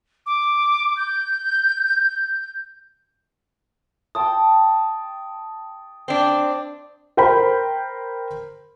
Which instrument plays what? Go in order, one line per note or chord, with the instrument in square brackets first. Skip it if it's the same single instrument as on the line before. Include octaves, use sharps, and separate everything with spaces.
[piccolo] D6
G6
[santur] G5 A5 C6 [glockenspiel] D#6
[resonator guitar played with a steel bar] C4 D4
[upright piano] A#4 C5 G5 A#5 B5